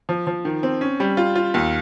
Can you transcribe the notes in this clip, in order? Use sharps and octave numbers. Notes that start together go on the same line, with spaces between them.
F3
F3
D#3
C4
C#4
G3
F4
F4
D#2